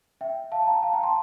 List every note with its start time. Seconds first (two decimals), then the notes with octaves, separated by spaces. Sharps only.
0.21 E5 G5
0.52 F5 A5
0.62 A5
0.67 G5 A#5
0.83 F5 A5
0.93 G5 A#5
1.03 A5 C6